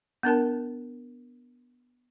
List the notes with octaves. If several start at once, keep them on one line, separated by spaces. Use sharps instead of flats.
B3 D4 A#4 A5